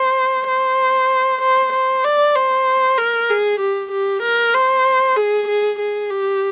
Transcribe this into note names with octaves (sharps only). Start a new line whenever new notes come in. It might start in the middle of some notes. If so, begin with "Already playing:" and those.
Already playing: C5
C5
C5
C5
D5
C5
A#4
G#4
G4
G4
A#4
C5
G#4
G#4
G#4
G4